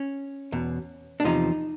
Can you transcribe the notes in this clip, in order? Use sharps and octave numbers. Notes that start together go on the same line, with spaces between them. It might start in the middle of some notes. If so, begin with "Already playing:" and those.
Already playing: C#4
E2 B2
D4
E2 C3 F3 D#4